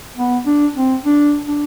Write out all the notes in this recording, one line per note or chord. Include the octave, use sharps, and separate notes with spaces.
B3
D4
C4
D4
D4